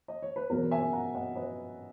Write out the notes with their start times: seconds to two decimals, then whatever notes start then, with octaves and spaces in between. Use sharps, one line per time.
0.08 D#5
0.22 C#5
0.36 B4
0.50 E2 B2 F#3 A#4
0.71 E5 G#5
0.93 F#5 A#5
1.15 D#5 F#5
1.35 B4 D#5